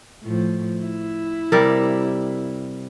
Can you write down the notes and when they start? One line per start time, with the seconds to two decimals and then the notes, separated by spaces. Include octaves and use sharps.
0.23 A2 F3
0.82 E4
1.52 C3 G3 A#4